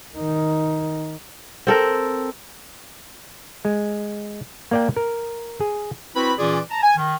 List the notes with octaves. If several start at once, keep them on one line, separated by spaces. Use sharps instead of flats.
D#3 D#4
C4 A4 A#4
G#3
A#3 D5 G5
A#4
G#4
C4 E4 F#4 B4 B5
A#2 E3 C#4 F4 G#4 D5
A5 A#5
G#5
D#3